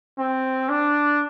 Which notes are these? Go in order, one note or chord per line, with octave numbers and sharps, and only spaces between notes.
C4
D4